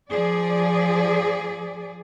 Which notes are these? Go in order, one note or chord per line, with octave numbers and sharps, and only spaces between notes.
F3 G#4 D5